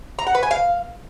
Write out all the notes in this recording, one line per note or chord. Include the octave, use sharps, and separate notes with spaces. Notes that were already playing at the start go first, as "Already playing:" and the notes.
A#5
F#5
B4
G#5
F5